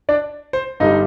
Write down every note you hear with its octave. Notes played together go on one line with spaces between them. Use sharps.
D4 D5
C5
G1 G2 D3 G3 D#4 D#5